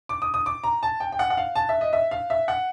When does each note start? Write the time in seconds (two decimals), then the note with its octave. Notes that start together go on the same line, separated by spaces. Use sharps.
0.09 D6
0.22 D#6
0.34 D#6
0.46 D6
0.64 A#5
0.83 A5
1.00 G5
1.12 G5
1.19 F#5
1.30 F#5
1.37 F5
1.55 A5
1.69 E5
1.81 D#5
1.93 E5
2.11 F5
2.30 E5
2.48 F#5